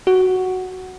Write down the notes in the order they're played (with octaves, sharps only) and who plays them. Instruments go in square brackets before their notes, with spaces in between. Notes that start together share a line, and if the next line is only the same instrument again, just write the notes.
[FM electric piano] F#4